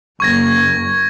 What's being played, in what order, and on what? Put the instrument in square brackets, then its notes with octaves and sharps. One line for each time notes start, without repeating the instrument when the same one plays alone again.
[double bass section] F#1 A#3 [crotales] C#6 G#6 A#6